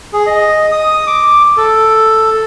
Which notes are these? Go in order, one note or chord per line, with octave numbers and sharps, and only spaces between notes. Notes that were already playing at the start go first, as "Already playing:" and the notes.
G#4
D#5
D#6
D6
A4